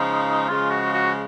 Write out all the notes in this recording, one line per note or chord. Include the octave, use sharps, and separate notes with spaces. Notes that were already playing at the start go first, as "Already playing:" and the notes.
Already playing: C#3 F3 G#3 D#4
C#3 F3 G#3 F4
F#4
F#4